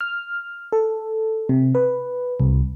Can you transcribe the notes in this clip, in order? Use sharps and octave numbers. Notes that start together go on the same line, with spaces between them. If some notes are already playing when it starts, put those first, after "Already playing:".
F6
A4
C3
B4
C2